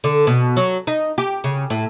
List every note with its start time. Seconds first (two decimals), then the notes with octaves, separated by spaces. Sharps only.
0.04 D3
0.27 B2
0.57 F#3
0.87 D#4
1.18 G4
1.44 C#3
1.70 A2